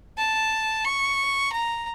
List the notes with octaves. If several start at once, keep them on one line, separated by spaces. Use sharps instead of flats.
A5
C#6
A#5